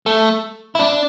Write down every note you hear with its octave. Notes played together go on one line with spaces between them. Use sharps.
A3
E4
D4